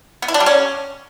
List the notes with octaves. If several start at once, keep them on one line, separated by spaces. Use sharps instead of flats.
B3
E4
D4
G3
C#4